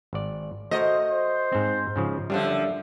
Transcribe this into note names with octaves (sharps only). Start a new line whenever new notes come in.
G#1 D5
A3 F#4 A#4 C5 D#5
C5
G#2 C4
G#2 C#3 F3
F#2 D3 F3 G3 D4 A4 E5